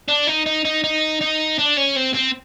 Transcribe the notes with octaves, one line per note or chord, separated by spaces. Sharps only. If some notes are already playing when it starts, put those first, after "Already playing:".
D4
D#4
D#4
D#4
D#4
D#4
D4
C#4
C4
C4